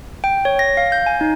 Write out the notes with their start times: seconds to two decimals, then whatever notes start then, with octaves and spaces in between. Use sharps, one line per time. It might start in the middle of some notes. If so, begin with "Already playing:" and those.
0.24 G5
0.45 C#5
0.59 A#6
0.77 F5
0.92 G6
1.06 G#5
1.21 D#4